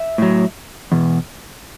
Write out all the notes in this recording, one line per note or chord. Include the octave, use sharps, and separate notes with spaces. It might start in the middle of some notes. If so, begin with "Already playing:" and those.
Already playing: E5
A2 F#3
E2 B2